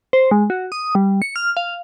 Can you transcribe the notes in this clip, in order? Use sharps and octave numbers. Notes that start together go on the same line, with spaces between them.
C5
G#3
F#4
D#6
G3
C#7
F6
F5